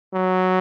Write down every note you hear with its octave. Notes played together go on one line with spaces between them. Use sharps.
F#3